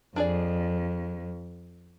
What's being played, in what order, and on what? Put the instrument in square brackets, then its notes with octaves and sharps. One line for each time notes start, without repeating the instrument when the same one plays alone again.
[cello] F2 [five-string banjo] D4 G#4 D5